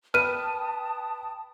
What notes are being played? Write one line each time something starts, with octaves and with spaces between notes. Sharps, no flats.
B4 G5 A5 D#6 F6 D#7